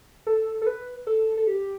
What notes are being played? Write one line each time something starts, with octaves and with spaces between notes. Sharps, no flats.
A4
A4
B4
A4
A4
G4